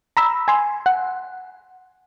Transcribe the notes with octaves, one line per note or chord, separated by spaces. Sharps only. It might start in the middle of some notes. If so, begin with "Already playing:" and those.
A#5 B5 E6
G#5 C6
F#5